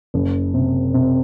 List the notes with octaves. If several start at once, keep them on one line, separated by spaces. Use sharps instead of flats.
F#1
C3
C3